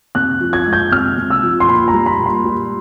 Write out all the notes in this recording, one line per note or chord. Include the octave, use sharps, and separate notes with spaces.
C3 F#6
F3
G#6
G#3
G6
C3 F6
C3
E6
F3
C6
A#2 B5
A#5
G3
B5
A#2
C6
G3